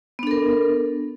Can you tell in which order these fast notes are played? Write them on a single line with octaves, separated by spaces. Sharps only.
B3 D4 A4 A#4